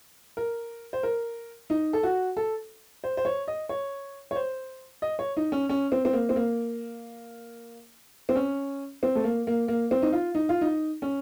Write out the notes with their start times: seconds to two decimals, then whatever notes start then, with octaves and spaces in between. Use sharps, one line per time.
0.37 A#4
0.93 C5
1.03 A#4
1.70 D#4
1.93 A4
2.03 F#4
2.37 A4
3.04 C5
3.17 C5
3.25 C#5
3.48 D#5
3.69 C#5
4.31 C#5
4.36 C5
5.02 D#5
5.19 C#5
5.37 D#4
5.52 C#4
5.69 C#4
5.92 C4
6.05 C4
6.13 A#3
6.29 C4
6.36 A#3
8.29 C4
8.36 C#4
9.03 C4
9.15 A3
9.24 A#3
9.47 A#3
9.68 A#3
9.91 C4
10.02 D#4
10.12 F4
10.35 D#4
10.49 F4
10.61 D#4
11.02 C#4